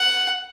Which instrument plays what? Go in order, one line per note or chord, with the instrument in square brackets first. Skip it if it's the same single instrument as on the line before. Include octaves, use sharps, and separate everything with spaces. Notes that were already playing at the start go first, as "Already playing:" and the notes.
Already playing: [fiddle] F#5